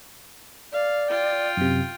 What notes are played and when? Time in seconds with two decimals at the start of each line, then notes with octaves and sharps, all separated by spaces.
0.73 D5 F5
1.10 F4 G5
1.57 F#2 C3